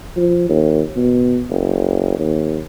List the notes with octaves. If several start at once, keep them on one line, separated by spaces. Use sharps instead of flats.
F3
D#2
B2
F#1
D#2